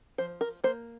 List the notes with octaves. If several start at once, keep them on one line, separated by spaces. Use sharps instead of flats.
F3 C5
A#4
A#3 C5